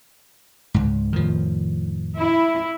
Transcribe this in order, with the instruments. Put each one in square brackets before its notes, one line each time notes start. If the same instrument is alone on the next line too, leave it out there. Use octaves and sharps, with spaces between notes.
[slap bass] C#2 G#2
[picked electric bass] F2 A2 [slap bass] D#3 F3
[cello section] E4